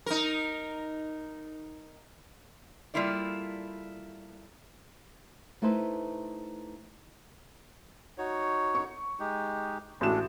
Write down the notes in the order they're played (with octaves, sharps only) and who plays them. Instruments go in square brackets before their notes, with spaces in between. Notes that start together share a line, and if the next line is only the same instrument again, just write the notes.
[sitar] D#4 A#4
[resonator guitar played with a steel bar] G3 A3 A#3 E4 F4 D5
[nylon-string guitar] A3 D#4 E4 B4 C5
[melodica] D#4 F#4 C#5
[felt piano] C#6
[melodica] G#3 D#4 G4
[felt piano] A1 F#4 E7 [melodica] G#3 D4 A4